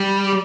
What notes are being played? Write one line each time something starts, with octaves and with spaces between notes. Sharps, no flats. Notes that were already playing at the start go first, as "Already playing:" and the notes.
Already playing: G3